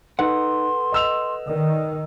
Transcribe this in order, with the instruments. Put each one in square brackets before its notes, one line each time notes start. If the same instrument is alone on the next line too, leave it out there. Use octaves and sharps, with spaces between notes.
[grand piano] D#4 [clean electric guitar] A4 B4 F#5 [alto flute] C6
[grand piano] D#5 E6 F7
[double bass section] D#3 [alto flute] D5